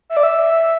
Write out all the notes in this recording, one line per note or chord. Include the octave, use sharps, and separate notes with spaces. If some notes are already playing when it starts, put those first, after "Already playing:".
E5
D5
E5